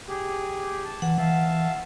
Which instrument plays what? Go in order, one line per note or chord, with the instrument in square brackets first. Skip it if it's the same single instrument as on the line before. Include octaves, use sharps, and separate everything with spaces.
[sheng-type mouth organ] G4 G#4
A5
[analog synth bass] E3 [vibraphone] F#5
[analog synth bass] E3 [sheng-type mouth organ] E5 F5 A5